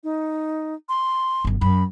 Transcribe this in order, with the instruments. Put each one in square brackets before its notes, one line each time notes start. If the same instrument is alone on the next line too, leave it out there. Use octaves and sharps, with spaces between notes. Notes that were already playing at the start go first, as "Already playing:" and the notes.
[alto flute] D#4
C6
[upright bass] G1 F#2
[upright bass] F#2 [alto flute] B5